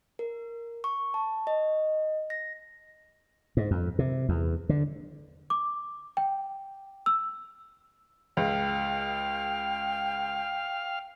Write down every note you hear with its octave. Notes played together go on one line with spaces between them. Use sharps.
A#4
C#6
A5
D#5
A#6
G#2
F2
C3
E2
D3
D6
G5
E6
C#2 F5 G5